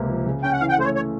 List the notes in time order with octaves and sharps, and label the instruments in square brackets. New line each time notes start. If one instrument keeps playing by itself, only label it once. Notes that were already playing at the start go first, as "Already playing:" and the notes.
Already playing: [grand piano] C#2 C3 A#3
F3
C#3
[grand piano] C#4 [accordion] G5
[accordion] F#5
[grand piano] E3 [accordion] F5
[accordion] G5
F#5
[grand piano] A3 [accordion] C5
[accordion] C#5
C#5